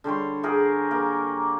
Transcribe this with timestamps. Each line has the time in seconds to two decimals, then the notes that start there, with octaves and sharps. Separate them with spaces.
0.04 D3 G3 C#5 C6
0.43 G4 G#4 A#4 F#5
0.91 A#3